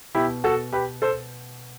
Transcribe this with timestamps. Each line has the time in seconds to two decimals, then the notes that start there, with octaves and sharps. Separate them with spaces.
0.15 B2 E4 G4
0.44 F#4 A4
0.73 G4 B4
1.02 A4 C5